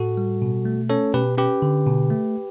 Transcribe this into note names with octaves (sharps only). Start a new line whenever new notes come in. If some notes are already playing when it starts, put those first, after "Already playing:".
Already playing: A2 F#4 A4
G3
B2
A3
C#4 A4 C#5
B2 G4 B4
C#4 G4 B4
D3
B2
A3